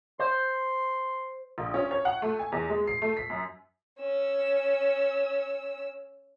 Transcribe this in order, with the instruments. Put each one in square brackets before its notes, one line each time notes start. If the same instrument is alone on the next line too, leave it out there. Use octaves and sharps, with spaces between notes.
[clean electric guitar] C5 [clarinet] C6
[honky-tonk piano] A#1
C#4
C#5
F#5
A3
G#5
E2
G#3
C7
A3
B6
F#2
[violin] C#4 E6